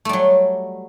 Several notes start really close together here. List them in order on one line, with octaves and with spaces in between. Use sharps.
A3 G3 F#3